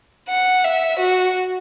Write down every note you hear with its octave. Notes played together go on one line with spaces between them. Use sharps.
F#5
E5
F#4